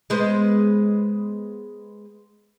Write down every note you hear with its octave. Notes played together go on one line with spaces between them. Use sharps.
G#3 B3 C5